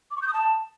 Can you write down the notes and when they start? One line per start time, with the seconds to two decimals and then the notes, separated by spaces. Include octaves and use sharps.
0.11 D6
0.16 C#6
0.22 G6
0.28 D#6
0.33 A5